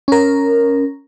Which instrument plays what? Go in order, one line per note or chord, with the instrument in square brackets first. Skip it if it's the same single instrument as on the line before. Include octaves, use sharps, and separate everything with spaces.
[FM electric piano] C#4 A#4